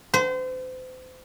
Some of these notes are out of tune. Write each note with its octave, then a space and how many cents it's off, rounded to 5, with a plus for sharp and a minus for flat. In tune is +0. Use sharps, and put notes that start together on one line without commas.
C5 -35